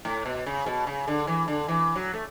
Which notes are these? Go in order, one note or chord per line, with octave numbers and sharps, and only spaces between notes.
A2
B2
C#3
B2
C#3
D3
E3
D3
E3
F#3
A3